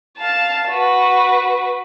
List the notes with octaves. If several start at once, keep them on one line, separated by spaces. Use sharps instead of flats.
F5 A5
F#4 B4